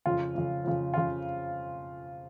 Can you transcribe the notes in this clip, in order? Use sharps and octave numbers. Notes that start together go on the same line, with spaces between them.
F2 C#3 F4
F2 C#3
F2 C#3
F2 C#3 F4